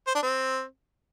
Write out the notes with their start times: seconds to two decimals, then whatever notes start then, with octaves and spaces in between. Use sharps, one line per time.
0.07 C5
0.15 D4
0.22 C4